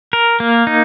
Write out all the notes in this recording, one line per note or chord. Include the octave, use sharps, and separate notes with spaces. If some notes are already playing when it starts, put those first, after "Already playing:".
A#4
A#3
D#4